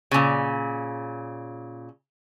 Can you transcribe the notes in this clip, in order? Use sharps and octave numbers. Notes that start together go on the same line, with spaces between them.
A#2 C#3